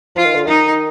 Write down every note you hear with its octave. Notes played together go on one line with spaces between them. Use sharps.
F3 F4
D#3
D3
D#3 D#4